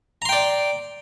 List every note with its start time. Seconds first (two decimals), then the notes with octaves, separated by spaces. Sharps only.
0.22 A#5
0.25 C6
0.29 G5
0.33 D5